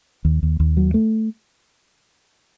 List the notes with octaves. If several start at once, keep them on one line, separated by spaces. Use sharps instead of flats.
D#2
D#2
D#2
F#3
A3